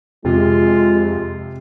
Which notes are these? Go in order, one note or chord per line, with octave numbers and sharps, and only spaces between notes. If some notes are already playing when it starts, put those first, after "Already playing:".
F2 C3 G#3 F4